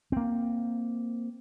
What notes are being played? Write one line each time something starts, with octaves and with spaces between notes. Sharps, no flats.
A#3 C4